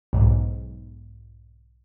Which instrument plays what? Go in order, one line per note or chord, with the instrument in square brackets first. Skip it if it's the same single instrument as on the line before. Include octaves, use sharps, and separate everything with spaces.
[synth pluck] B1 G#2